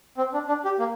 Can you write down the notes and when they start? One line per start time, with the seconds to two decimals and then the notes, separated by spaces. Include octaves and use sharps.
0.17 C4
0.34 D4
0.48 D4
0.65 G4
0.79 A#3